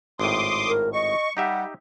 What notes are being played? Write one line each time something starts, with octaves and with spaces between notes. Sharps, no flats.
G#1 A2 C6 D6 D#6
A#4
D#5 C#6
G3 D#4 G4 E5 F#5